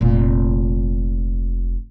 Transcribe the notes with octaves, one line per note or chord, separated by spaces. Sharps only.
F1 A#2